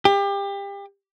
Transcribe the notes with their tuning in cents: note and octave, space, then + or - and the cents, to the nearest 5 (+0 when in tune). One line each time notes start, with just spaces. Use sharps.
G4 +30